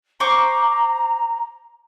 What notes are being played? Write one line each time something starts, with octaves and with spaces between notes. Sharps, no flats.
C5 A#5 C#6 D6